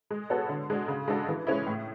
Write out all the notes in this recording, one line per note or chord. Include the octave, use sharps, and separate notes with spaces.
G#3
B3 F#4 A4 C#5
D3
G#3 D4 F#4
C#3
G#3 D4 F#4 A4
E3
G#3 C#4 E4
A2